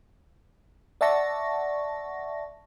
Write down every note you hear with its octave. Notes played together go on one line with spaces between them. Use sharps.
D5 E5 F#5 A5 C#6 A#6